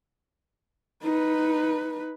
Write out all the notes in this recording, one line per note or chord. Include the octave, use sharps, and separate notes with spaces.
D#4 B4